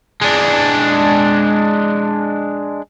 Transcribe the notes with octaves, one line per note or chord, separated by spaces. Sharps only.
G#3 D4